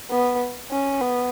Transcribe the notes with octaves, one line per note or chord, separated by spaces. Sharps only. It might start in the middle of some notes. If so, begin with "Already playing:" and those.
B3
C#4
B3